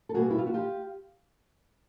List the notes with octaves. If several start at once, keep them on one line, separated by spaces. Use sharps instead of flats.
A4
B2 G3 A#3 F#4 G#4
E4
F4
F#4
F4 G4